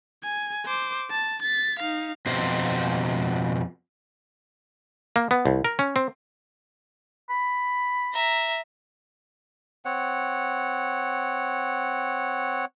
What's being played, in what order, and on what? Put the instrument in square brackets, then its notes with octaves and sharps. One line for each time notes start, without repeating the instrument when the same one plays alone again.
[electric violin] G#5
C5 D6
A5
A6 B6
D#4 F5
[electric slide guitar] F2 B2 C5
[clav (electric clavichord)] A#3
B3
C2
A#4
C#4
C4
[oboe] B5
[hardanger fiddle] E5 A#5
[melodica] C4 C#5 F#5